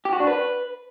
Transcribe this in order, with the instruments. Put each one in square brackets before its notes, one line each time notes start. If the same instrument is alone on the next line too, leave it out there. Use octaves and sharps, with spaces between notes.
[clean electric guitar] G4
F#4
D4
B4